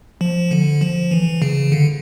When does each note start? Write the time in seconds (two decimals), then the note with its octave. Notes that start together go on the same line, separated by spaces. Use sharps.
0.21 F3
0.51 D3
0.81 F3
1.11 E3
1.42 C#3
1.72 D3